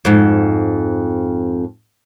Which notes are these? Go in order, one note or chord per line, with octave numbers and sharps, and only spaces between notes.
F2 G#2